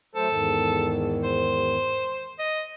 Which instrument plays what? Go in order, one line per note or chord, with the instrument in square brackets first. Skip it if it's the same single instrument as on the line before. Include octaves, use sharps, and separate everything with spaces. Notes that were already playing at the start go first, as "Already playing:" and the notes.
[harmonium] F#3 A3 C5 [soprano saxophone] A4
[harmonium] E2 G#2 D#3
[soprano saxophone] C5
D#5